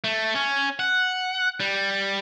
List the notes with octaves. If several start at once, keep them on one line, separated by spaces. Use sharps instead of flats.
A3
C#4
F#5
G3